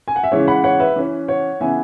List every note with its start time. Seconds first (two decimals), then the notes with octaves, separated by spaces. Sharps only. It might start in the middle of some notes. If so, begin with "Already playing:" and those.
0.08 G#5
0.16 F#5
0.23 E5
0.32 C#3 E3 G#3 C#5
0.48 F#5 B5
0.64 C#5 F#5
0.80 B4 E5
0.96 E3 C#4
1.28 C#5 F#5
1.60 C#3 E3 B3 E5 G#5